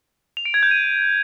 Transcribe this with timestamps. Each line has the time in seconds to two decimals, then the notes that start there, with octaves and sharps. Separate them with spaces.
0.37 F7
0.45 D7
0.54 G#6
0.63 G6
0.71 D#7